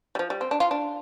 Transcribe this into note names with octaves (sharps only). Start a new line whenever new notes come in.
G3
F3
G3
C4
D4
F4
D4